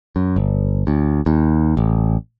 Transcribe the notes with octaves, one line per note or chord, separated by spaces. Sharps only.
F#2
G1
D2
D#2
A1